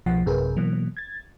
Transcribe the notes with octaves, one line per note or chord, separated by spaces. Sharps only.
C2 B2 F3 F#5
A1 F#2 C3 G#4 A#4 B4
B2 E3 F#3 A#3
G#6 A6